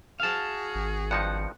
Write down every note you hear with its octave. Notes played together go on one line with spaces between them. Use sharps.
F#4 G#4 F5 A5
G#1
G2 F3 D#4 F#5